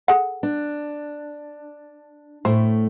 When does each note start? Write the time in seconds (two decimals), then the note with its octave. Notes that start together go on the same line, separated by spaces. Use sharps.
0.08 G#4 A4 F#5
0.43 D4
2.45 A2 A3 C5